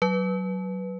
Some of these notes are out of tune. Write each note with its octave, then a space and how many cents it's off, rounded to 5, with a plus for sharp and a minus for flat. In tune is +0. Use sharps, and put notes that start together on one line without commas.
F#3 +15 B4 +0